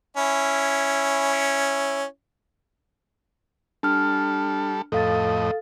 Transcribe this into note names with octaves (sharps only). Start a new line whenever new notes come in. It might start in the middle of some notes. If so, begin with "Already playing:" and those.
C#4 E4
G3 D4 A4 F6
F2 A2 A4 D#5 F5 A6